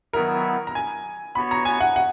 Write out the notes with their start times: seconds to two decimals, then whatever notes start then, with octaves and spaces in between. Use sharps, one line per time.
0.13 D#3 F#3 B3 E4 A#4
0.67 A#5
0.75 G#5
1.35 B3 F#4 C#5 B5
1.51 A#5
1.65 G#5
1.81 F#5
1.96 F#5